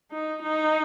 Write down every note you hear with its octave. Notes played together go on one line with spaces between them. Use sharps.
D#4
D#4